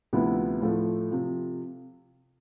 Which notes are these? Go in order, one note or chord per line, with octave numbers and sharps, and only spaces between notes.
D2 C3 F3 B3 E4
A2 F3 A3
C3 F3